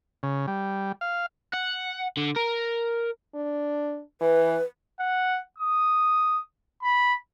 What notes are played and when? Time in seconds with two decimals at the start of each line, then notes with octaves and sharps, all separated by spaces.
0.23 C#3
0.48 G3
1.01 F5
1.54 F#5
2.17 D3
2.36 A#4
3.35 D4
4.21 E3 B4
4.99 F#5
5.59 D#6
6.82 B5